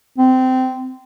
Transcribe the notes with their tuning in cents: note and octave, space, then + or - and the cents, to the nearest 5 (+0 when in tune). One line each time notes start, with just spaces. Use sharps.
C4 -20